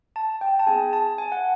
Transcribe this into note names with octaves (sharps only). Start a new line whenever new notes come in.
A5
G5
A5
B3 D#4 G#4 G#5
A5
G#5
F#5